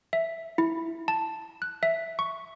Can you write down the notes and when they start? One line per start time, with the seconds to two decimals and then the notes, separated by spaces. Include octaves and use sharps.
0.13 E5
0.58 E4
1.08 A5
1.62 F#6
1.83 E5
2.19 C#6